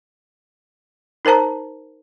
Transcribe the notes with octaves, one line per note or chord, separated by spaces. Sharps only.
D#4 A#4 C5 A5 A#5